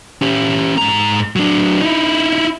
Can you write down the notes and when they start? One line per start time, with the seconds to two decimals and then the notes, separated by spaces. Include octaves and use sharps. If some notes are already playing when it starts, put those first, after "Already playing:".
0.22 C#4 G4
0.78 G#2 A#5
1.36 F#3 D4
1.81 D#4 E4